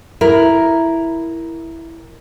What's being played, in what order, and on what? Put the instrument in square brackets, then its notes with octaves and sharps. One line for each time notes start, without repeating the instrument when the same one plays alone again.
[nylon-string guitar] E4 A#4